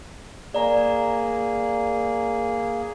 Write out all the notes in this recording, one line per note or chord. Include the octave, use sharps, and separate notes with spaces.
A#3 G#4 D5 A#5